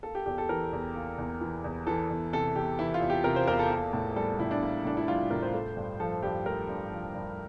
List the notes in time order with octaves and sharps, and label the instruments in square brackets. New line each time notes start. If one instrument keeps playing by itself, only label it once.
[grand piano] A#3 A4
G4
E2 G4
A4
E3 A#4
E2
A#3
E2
E3
E2
E3 A4
E2
C3 A4
E2 G4
E3 E4
F4
E2
G4
C3 A#4
C5
E2 A#4
A4
A#3
A2
G3 A4
A2 E4
D4
A#3
A2 D4
E4
G3 F4
A2 A#4
C5
A3
G2
F3 A4
G2 G4
A3 A#4
G2
F3
G2